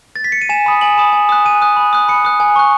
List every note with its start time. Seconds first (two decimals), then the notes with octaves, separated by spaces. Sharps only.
0.16 A6
0.24 B6
0.32 C#7
0.41 D#7
0.49 G#5 E7
0.66 B5 D#6
0.81 G#5 F#7
0.97 B5 D#6 E7
1.13 G#5
1.29 D#6 F#6
1.45 G#5 D#7
1.62 D#6 F#6
1.77 B5
1.93 D#6 F#6
2.08 B5 C#7
2.25 D#6 F#6
2.40 G#5
2.56 C#6 F#6